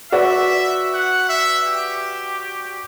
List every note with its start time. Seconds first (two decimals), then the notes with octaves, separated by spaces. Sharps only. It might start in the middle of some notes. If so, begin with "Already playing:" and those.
0.12 F#4 B4 D5 E5
0.94 F#5
1.29 E5
1.67 G4